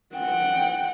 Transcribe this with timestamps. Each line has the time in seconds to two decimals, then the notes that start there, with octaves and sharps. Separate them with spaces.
0.16 F#5 G5